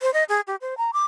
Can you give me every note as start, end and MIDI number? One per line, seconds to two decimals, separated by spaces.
0.02 0.13 72
0.14 0.24 75
0.29 0.41 68
0.47 0.56 67
0.61 0.77 72
0.78 0.91 82
0.93 1.06 86